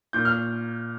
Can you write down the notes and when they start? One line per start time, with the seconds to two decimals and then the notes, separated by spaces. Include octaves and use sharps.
0.13 A#2 G6
0.25 F6